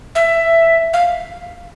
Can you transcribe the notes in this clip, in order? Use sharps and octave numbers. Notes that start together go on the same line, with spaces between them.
E5
F5